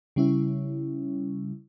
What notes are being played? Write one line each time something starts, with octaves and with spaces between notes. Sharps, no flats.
C#3 G3 C#4 E4